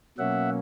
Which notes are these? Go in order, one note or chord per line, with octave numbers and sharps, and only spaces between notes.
B2 F#3 A#3 C#4 E5 F#5